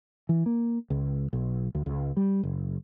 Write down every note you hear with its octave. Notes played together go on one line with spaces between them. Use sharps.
E3
A#3
C#2
B1
D2
C#2
G3
F#1